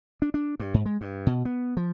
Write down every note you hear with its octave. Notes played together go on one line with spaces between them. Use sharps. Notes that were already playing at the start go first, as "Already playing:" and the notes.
D4
D4
G2
G#2
G#3
G2
B2
B3
F3